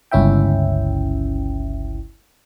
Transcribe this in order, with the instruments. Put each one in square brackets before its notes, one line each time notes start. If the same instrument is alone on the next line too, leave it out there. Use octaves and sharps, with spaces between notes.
[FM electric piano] G1 C#2 C#4 E4 E5 G5